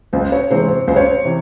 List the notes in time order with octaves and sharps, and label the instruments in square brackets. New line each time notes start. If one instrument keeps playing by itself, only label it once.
[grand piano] C#2 [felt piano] C5
[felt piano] C#5
[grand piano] C3 E3 G#3 C4 [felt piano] C5
[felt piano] C5
[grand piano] C#2 [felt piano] C5
[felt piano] C#5
C5
[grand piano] C3 E3